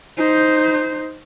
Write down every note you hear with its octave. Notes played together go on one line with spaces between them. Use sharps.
D#4 C5